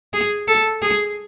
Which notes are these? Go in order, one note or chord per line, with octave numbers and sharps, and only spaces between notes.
G#4
A4
G#4